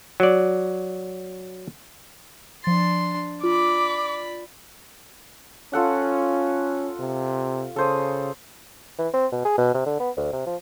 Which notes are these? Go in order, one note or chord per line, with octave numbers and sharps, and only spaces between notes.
F#3 D5
F3 D4 C6 A6
F4 D5 B5 D6
C#4 F4 A4 F#5
C3
C#3 A4 C5 D#6
E3
C4
B2
G#4
B2
C3
D3
B3
D2
C3
F3